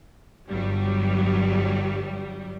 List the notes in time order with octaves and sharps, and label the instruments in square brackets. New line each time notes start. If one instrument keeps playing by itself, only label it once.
[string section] G1 G2 F#3 G3